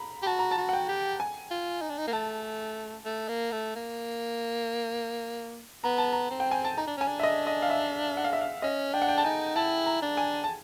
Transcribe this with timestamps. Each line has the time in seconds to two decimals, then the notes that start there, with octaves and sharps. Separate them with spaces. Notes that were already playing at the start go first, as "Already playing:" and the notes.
Already playing: A#5 B5
0.22 G4
0.26 F#4 A5
0.39 A#5
0.51 A5
0.57 F#4
0.69 F#5
0.73 G5
0.89 G4
1.20 G#5
1.51 F4
1.82 D#4
1.90 D4
1.98 D#4
2.07 A#3
2.13 A3 A5
3.05 A3
3.29 A#3
3.52 A3
3.75 A#3
5.84 B3 A#5
5.98 A5
6.13 A#5
6.31 C4
6.40 G5
6.51 G#5
6.64 A5
6.77 D#4 A#5
6.87 D4
6.98 C#4 G#5
7.08 D4
7.20 E5
7.23 D#5
7.47 D#5
7.62 F5
7.70 E5
8.17 F#5
8.24 F5
8.33 E5
8.41 F5
8.62 C#4 D#5
8.94 D4 G5
9.02 F#5
9.09 G5
9.17 A5
9.24 D#4 G#5
9.55 E4 A5
9.86 A#5
10.02 D4
10.17 G#5
10.44 A5